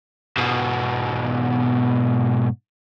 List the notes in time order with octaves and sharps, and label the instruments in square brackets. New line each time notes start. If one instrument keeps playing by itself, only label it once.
[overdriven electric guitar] G#2 B2